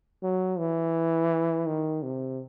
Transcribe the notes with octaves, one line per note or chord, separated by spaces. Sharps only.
F#3
E3
D#3
C3